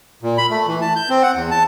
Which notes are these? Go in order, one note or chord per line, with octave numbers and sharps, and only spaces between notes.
A#2
B5
A3
E3
A5
G6
C4
F#5
E2
A5